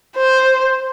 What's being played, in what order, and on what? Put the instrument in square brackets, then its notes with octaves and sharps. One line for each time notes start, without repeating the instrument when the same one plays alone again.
[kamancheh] C5